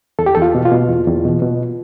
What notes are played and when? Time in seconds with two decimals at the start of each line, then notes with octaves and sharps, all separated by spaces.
0.19 E2 A4
0.26 G4
0.35 E2 A4
0.42 F4
0.55 B2
0.65 F4
0.72 B2
0.89 E2
1.07 E2
1.25 B2
1.42 B2